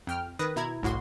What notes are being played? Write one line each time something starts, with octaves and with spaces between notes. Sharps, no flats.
F2 G5 F6
D#3 B4 D#6 A#6
B2 E4 A#5 G#6
G1 C2 A2 F#4 C6